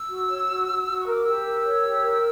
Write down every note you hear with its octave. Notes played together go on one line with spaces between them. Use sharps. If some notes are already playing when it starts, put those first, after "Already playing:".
Already playing: E6
F#4
C#5
F#4
F#4
F#4
C#6
A#4
D6
G4 E6
A#4
C#5
G4
A#4